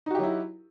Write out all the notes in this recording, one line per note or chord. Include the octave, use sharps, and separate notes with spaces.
F#3 D#4 E4 F#4 G4